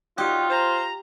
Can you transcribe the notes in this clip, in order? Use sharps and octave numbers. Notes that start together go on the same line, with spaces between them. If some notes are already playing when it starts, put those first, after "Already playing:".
F#3 G3 D#4 F4 G4
C5 A#5